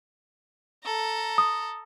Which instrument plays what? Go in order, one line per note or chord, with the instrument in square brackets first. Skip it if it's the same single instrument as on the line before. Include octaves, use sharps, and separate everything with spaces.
[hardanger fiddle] A4 A#5
[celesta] D#6